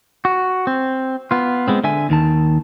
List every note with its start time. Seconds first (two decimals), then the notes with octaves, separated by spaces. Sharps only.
0.25 F#4
0.67 C4
1.31 B3 F4
1.68 G#3 B3 C4
1.84 D3 E5 G#5
2.09 D#2 D#3 A5